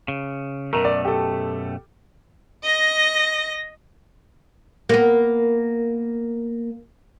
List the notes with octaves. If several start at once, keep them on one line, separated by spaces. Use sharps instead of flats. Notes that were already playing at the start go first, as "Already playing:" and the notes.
C#3
F#2 B2 A3 A#4
D5
G4 A4
D#5 A#6
A#3 B3